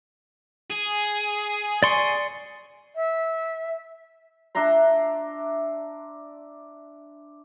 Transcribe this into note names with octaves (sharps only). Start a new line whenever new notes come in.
G#4
D5 C6 C#6
E5
D4 E5 A#5 C6